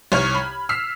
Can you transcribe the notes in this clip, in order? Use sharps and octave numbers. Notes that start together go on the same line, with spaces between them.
C2 C#5 F6 G#6
B5
E6 F6 B6 C7